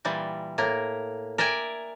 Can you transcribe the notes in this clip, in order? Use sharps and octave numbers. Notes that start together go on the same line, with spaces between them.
A#2 E3 G3
A2 A#3 A#4
A#4 D5 E5 G5 G#5